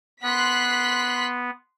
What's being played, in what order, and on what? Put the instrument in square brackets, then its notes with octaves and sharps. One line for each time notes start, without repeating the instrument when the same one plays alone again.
[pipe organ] B3 [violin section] C6 F#6 B6